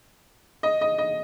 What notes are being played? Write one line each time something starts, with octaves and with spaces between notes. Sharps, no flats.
D#5
D#5
D#5